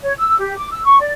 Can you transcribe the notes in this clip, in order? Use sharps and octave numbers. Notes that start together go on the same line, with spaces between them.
C#5
E6
G4
D6
E6
C#6
D5